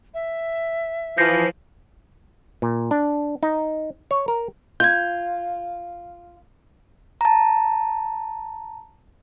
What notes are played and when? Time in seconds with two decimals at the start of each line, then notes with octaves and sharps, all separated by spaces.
0.14 E5
1.18 E3 F3 G6 A#6 C7
2.62 A#2
2.91 D4
3.43 D#4
4.11 C#5
4.28 A#4
4.80 F4 G6 G#6
7.21 A5 A#5